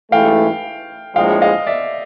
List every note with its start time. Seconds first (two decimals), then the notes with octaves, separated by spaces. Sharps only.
0.11 A1 G#2 E3 A3 F5 G5
1.15 A#1 A2 F3 G#3 F5 G5
1.42 D#5 F5
1.67 D5 E5